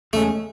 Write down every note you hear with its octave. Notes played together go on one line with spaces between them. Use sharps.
E2 C#3 G#3 A3 C#4